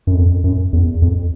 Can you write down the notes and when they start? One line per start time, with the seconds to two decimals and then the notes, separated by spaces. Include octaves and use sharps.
0.07 F#2
0.14 F2
0.44 F#2
0.73 E2
1.02 F2